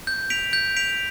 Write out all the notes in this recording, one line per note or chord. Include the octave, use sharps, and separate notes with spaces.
G6
B6 D7 F7
G6
B6 D7 F7